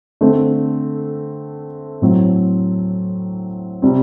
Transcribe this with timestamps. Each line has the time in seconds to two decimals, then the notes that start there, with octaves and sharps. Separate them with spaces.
0.21 D3 A3 C4
2.02 A2 F#3 C4
3.82 C3 G3 C4